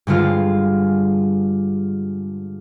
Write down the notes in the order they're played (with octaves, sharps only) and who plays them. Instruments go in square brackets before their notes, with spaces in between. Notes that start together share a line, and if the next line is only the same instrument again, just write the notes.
[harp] G2 D3 G#3 F4